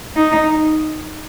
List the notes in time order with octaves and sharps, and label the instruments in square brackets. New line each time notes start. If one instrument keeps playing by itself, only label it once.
[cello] D#4